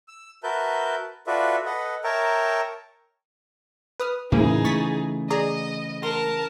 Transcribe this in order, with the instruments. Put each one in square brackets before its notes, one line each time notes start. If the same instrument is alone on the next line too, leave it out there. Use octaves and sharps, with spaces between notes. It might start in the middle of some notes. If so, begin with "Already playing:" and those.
[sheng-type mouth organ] E6
F#4 A#4 B4 E5 A5 G6
F4 F#4 A4 B4 D5 E5
A4 B4 D#5 F#5
A#4 C#5 E5 G5 A5 A#5
[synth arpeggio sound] B4 D#6 F6
[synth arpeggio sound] D2 F3 A#3 [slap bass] A2 [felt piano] C#3 E3 [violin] D#4 G#4
[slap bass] A3 [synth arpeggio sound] C#6 A6 B6
[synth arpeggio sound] G#4 D5 A#5 [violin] D#5
[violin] A#4 A5 [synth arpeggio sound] C6